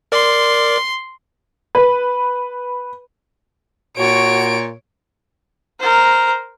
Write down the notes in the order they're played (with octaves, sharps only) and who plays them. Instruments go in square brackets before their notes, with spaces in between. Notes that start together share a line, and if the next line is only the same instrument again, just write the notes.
[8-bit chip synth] A#4 D5 D6 [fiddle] C6
[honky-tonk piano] B4
[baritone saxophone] A#2 [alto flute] F#4 [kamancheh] C#5 C#6 [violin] D7
[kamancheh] A#4 C5